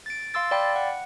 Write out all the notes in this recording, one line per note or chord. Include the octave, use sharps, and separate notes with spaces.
A6 D7
F5 C6 E6 A6
D5 F5 G5 B5
F#5